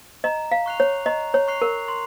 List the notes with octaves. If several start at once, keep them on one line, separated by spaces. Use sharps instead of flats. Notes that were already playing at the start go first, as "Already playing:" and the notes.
D#5 A#5
F5
C#6 F#6 C7 F7
C#5
D#5 A#5
C#5
C#6 F#6 C7 F7
A#4
C6